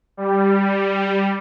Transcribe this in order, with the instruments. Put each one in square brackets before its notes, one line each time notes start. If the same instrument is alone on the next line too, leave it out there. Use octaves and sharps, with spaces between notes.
[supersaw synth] G3